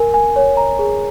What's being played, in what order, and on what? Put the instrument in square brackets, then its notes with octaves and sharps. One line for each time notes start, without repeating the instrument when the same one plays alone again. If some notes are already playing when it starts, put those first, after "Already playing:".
Already playing: [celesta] A#4 G#5
G#5
C#5
A#5
G#4